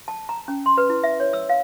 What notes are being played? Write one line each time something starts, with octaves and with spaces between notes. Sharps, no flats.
A5
A#5
C#4
C6
B4
E4
E5
C#5
E6
F5